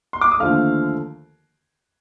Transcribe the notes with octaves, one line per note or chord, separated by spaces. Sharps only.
C6
D6
D#6
D#2 D3 F3 A3 F5 F6